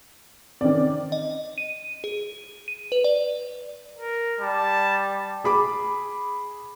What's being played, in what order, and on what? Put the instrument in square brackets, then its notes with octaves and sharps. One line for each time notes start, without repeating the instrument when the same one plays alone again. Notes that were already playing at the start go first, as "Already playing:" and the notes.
[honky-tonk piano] D#3 D5 [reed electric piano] C4 C#4
[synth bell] D#5
D#7
G#4
D#7
B4
D5
[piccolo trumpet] A#4
[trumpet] G3 [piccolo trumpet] A5
[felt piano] G#4 B5 D6